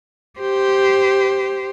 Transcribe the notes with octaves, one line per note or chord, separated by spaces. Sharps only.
G4 C5